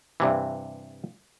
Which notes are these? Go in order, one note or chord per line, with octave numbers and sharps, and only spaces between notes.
G2 C3 E3